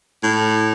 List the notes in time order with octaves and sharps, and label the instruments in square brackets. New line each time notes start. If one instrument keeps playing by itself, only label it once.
[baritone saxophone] A2